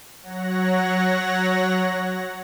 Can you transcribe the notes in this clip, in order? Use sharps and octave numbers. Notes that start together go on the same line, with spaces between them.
F#3 C#5 F#5 A#6